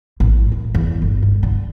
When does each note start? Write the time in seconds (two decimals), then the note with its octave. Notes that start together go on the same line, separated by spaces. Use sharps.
0.20 A1
0.52 D#2
0.75 E2
1.02 G1
1.22 G2
1.43 D3